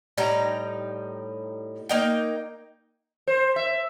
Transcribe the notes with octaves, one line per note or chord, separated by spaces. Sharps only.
A2 G3 D#4 A#5
A#3 D#4 G5
C5
E5